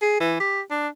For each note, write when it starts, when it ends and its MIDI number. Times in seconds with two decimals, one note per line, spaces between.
0.02 0.17 68
0.20 0.36 52
0.40 0.61 67
0.71 0.88 62